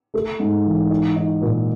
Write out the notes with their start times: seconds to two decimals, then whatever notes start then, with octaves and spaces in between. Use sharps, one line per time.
0.14 A3
0.39 G#2
0.65 E3
0.90 D#4
1.16 D#4
1.41 A#2